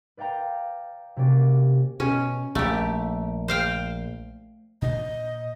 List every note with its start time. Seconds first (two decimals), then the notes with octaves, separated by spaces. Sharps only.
0.17 B4 D5 F5 G5 A#5
1.16 C3 A#3 C#4 F#4 D5
2.00 B2 C#4
2.55 A#1 A3 G4
3.48 C5 F5 G5
4.82 A#2 D4 D#5